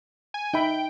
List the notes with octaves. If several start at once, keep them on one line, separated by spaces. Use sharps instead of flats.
G#5
D#4 E5 G5 B5